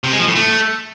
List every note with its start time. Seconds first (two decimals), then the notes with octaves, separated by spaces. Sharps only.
0.04 C3
0.12 G#3
0.19 F3
0.27 A2
0.35 A3